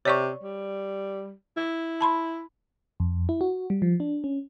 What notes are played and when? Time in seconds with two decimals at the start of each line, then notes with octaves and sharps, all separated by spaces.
0.05 C3 C#5 D5 C#6
0.43 G3
1.57 E4
2.01 A5 B5 C6
3.00 F2
3.29 E4
3.41 F#4
3.70 G3
3.82 F3
4.00 D4
4.24 C#4